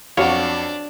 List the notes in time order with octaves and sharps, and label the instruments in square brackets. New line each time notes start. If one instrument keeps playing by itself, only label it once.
[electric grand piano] F2 [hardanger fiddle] D4 [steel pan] F#4 F5 [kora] C#5